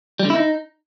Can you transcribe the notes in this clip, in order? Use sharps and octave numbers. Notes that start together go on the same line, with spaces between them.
G3
D3
E4
D#4